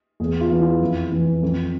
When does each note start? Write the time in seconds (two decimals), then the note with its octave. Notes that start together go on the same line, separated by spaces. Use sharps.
0.20 E2 G#4
0.41 F4
0.51 E3
0.61 E4
0.81 F2
1.12 E3
1.43 F2